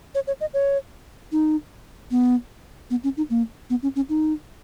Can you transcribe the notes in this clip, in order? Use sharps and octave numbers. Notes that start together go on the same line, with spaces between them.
C#5
C#5
D#5
C#5
D#4
B3
B3
C#4
D#4
A#3
B3
C#4
C#4
D#4